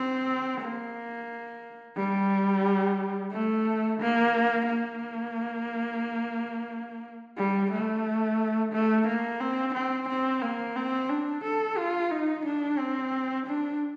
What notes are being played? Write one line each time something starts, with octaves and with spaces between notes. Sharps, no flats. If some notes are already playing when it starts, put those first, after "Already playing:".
Already playing: C4
A#3
G3
A3
A#3
A#3
G3
A3
A3
A#3
C4
C4
C4
A#3
C4
D4
A4
F4
D#4
D4
C4
D4